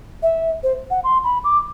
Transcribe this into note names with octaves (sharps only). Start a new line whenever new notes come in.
E5
C5
F#5
C6
B5
D6